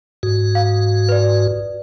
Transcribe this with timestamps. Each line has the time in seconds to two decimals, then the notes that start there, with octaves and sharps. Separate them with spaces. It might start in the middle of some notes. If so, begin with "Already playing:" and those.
0.23 G#2 F#4
0.55 F5
1.09 B4 D5